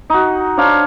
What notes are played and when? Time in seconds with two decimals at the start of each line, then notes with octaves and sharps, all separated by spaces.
0.10 D#4 F#4
0.57 D4 C5 C#5 F5